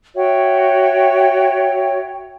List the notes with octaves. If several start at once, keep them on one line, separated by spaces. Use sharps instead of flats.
F#4 C#5 E5 G5